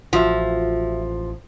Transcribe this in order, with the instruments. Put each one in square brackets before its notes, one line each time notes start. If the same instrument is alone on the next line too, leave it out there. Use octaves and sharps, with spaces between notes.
[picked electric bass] A1 [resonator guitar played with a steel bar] F3 [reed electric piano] F4 F#4 E5